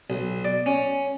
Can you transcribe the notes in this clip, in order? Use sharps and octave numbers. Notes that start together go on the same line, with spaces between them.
B1
D5
C#4